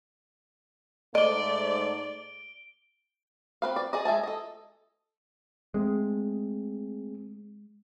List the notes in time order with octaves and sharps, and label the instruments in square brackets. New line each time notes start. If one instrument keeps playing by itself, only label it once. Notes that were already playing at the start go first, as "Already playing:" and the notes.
[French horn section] G#2 A3 [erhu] D5 [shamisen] D#5 [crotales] D7 G7
[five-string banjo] C4 B4 F5
D5
G#4 D5 D#5
G#3 E5 G#5 A5
A4 D#5
[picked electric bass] G#3 [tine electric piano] A3 C4 G#4